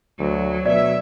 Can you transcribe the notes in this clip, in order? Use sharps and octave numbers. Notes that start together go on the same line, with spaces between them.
D2 F#3
B2 D5 E5